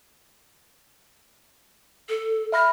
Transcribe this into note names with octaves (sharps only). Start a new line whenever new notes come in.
A4
E5 B5 F6 A#6